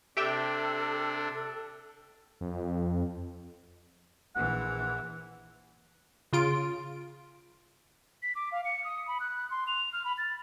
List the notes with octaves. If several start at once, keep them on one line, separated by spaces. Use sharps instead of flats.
C3 D4 G4 A4 E5 G5
F2
A#1 E3 F#5
C#3 F4 D7
B6
D6
F5
C#7
D#6
B5
F#6
C6
F7
F6
B5
A6